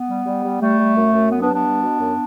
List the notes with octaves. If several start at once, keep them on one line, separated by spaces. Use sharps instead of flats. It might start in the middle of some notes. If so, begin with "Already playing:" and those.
Already playing: B3
G3
G3
G3
G3 A3
G3
F#2
F#2
F#3 B3
B3 D4
G2
B3 D4
G3
B2
F#2